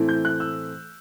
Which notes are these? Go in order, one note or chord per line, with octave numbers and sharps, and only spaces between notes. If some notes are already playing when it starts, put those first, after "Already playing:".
Already playing: A2 E3 A3 C4 E4
G6
F#6
E6